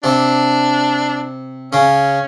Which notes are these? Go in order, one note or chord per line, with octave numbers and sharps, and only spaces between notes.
C3 D4
C#3 C#4